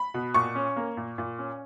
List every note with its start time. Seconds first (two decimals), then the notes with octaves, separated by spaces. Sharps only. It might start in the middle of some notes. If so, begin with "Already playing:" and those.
Already playing: B5
0.14 B2
0.34 A#2 C#6
0.55 C#4
0.76 A#3
0.97 A#2
1.18 A#2
1.39 C#4